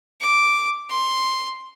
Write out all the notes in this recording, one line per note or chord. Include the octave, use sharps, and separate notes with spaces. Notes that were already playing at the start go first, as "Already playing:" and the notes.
D6
C6